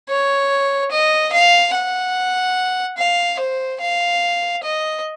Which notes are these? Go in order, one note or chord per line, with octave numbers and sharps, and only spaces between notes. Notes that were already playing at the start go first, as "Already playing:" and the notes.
C#5
D#5
F5
F#5
F5
C5
F5
D#5